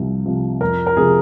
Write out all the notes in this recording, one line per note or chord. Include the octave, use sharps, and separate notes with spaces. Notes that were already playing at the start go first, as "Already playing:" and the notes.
Already playing: C2 C3 F3
C3 F3
F2 A#4
A#4
C3 F3 G#4